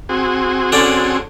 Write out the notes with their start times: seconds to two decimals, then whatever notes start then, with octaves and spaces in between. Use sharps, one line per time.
0.09 C4 F#4 G#4
0.72 D3 C#4 D4 A4